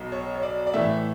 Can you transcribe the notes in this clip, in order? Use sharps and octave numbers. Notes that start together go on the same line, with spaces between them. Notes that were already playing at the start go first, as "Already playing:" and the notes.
Already playing: B1 B2
C#5
C#5
D5
D5
A2 E3 A3 E5